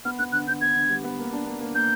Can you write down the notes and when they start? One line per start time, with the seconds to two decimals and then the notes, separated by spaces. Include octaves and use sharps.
0.05 B3 F6
0.19 B3 F#6
0.32 D3 F#6
0.47 D3 G6
0.61 B3 G#6
0.75 D3
0.90 G3
1.04 B3
1.19 A#3
1.33 D4
1.47 A#3
1.60 A#3
1.75 A#3 G6